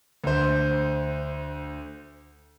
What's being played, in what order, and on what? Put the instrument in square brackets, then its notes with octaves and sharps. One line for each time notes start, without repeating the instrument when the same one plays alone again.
[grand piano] D2 C5